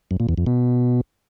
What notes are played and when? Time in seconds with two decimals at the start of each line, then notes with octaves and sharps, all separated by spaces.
0.11 F#2
0.20 A#2
0.29 E2
0.38 F2
0.46 B2